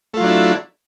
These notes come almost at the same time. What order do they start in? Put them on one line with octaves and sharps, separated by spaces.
A3 F4 F#3 D4 E4